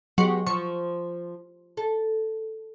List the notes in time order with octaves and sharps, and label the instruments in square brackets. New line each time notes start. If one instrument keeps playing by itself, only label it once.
[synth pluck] F#3 [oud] G#3 B3 G4
[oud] F3 [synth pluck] C#6
[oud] A4